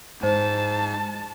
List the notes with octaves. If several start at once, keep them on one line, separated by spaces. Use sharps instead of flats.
G#2 C5 A5